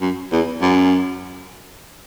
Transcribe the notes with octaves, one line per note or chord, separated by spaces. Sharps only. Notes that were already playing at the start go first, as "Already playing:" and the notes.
F#2
E2
F#2